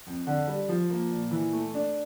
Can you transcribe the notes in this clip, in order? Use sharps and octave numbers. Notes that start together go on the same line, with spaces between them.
F2
D3
G3
F3
A#3
A#2
E3
A3
D4